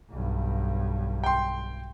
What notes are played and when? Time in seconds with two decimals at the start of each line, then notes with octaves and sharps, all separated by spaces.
0.10 B1 G2
1.24 G5 C6